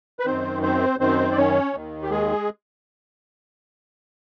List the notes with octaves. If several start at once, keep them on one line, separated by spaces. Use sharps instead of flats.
B4
F#2 D#3 C4 C5
C4 C5
F#2 D#3 C4 C5
D5
C#4 C#5
D#2 D#3
G4
G#3 G#4